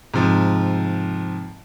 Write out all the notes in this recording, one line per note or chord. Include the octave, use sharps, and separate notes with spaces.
G#2 C3 F3